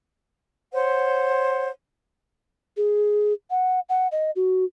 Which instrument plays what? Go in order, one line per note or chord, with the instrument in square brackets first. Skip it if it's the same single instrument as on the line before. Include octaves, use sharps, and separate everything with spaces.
[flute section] C5 C#5 F#5
[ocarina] G#4
F#5
F#5
D#5
F#4